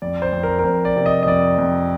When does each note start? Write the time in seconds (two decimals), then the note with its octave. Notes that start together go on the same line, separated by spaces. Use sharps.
0.02 F2 D5
0.22 C5
0.33 F2
0.43 A#4
0.59 A#4
0.64 F2 C5
0.85 D5
0.96 C3
1.06 D#5
1.23 D#5
1.27 F2 D5
1.59 F2